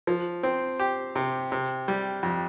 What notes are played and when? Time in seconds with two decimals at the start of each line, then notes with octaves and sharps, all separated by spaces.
0.07 F3
0.43 C4
0.79 G4
1.16 C3
1.52 C3
1.88 G3
2.23 F2